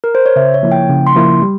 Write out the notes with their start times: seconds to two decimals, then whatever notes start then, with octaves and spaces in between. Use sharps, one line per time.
0.04 A#4
0.15 C5
0.26 C#5
0.36 C#3 E5
0.54 C#5
0.63 F3 A#3 E4
0.72 G5
0.90 C#3
1.07 C6
1.16 F3 A#3 E4
1.42 G3